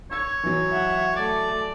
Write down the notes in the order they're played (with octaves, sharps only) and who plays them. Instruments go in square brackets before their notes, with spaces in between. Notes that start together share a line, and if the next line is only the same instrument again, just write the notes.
[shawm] C#5 [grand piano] E6 G#6
[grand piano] E3 F#3
[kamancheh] E5 F#5
[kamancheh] A3 [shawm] D5